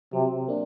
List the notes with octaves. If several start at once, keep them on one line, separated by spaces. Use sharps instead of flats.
C3 F#3
A#3 D4